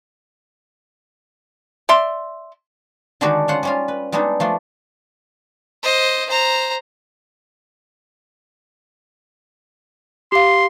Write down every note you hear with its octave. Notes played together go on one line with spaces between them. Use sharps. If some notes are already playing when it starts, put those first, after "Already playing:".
D5 E5 C6
D3 D#3 G#3 D4 F#4 G4
C#4 F4 C5 F#5
G3 C#4 F4
B4
G3 G#3 B3 D4 D#4
F3 A3 D4
C5 D#5
C5 A#5
G4 F5 C6